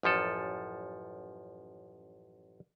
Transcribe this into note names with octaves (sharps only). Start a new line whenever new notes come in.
A1 F#2 F3 A4